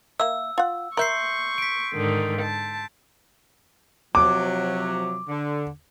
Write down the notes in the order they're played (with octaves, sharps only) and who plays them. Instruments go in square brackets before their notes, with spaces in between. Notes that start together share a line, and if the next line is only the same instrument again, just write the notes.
[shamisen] A#3 E5 [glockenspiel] E6
[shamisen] F4 F#5
[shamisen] A#4 E5 [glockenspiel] C6 G6 C7 [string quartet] C#6
[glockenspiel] B6 D7
[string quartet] G#2 D3 D#3
A5
[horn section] C3 F3 F#3 [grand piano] D6
[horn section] D3